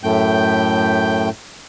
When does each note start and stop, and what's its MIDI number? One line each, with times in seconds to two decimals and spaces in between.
0.04 1.29 42
0.04 1.29 45
0.04 1.29 57
0.04 1.29 79
0.04 1.29 91